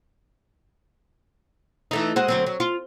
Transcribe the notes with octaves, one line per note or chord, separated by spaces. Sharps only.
E3 A3 D#4
G#3 F#4 C5
D2 F#3 C4
F#3
F4